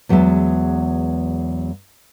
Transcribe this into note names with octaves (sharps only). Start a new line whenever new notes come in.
E2 F#3 G#3 B3 E5